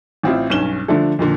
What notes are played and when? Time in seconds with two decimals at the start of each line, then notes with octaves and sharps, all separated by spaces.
0.23 A1 C4 E4 F4
0.50 B1 G2 C#4 E7 G7
0.88 D3 F3 A3 D4 A4
1.19 F2 A#2 D3